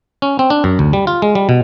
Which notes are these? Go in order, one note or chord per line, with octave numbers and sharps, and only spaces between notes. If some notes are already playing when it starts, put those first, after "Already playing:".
C#4
C4
D4
F#2
D2
G3
F4
G#3
G3
B2